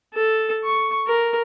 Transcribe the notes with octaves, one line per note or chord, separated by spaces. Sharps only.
A4
C#6
A#4